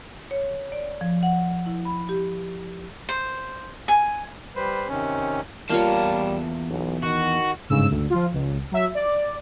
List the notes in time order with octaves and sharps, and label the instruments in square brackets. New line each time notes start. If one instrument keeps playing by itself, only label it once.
[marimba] C#5
D5
F3
F#5
E4
B5
G4
[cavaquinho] C5
G#5
[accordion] G3 B4 C5
C3 D#3 C#4
[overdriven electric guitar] E2 A5 [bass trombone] G3 [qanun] A#3 F4 C#5
[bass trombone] B1
[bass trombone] D#3 [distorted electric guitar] F#4
[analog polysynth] G1 G#2 C#3 E6
D2
F3 F4
C#2
F#3 E5
D5